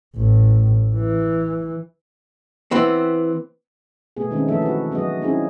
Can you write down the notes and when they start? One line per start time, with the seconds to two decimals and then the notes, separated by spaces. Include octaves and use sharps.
0.16 A1 A2
0.95 E3
2.71 E3 B3 C4
4.17 B2 A3 B3 G#4
4.31 D#3 G#3 C4 C#4 D#4
4.48 E3 F3 A3 B3 A4 E5
4.62 F#4 B4
4.91 F#3 B3 F#4 G#4 D#5
5.22 A#3 C4 C#4 D#4 E4 G#4